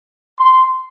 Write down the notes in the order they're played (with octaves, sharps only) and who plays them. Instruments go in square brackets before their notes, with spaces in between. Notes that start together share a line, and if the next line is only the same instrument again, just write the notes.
[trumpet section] C6